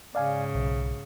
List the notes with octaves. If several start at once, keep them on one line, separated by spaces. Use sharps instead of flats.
G#2 C#3 D5 F5 G#5
B1